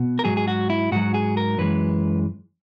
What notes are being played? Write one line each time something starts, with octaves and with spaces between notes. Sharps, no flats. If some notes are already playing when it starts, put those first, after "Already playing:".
Already playing: B2
A#4
G#2 F#3 G#4
G#4
F#4
E4
G#2 F#3 F#4
G#4
A#4
F#2 E3 G#3 B4